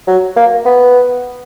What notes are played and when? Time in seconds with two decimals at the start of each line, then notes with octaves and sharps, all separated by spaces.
0.07 F#3
0.36 A#3
0.65 B3